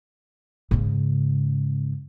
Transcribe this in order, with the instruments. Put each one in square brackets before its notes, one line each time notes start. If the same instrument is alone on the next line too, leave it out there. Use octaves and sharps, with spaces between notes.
[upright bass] G#2 C#3